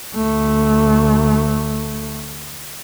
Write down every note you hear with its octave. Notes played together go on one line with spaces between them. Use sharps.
D2 A3